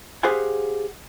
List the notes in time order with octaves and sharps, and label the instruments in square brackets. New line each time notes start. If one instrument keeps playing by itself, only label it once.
[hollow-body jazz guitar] G4 G#4 C5 F5 F#5 G#5